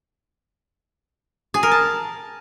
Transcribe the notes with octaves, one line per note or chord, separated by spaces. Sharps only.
G#4
A#4
A5